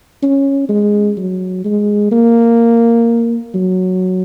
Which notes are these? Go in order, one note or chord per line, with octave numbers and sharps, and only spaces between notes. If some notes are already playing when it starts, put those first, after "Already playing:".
C#4
G#3
F#3
G#3
A#3
F#3